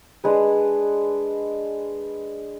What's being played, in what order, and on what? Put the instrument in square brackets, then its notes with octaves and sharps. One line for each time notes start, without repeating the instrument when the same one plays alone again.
[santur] G#3 D4 G#4 B4